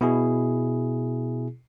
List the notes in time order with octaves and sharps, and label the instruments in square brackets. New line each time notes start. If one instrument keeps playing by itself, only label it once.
[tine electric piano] B2 E4 G#4